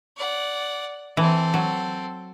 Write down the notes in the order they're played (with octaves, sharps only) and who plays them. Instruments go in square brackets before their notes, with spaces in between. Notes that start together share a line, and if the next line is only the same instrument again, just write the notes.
[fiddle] D5 F#5
[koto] E3 [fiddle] C4 A4
[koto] F#3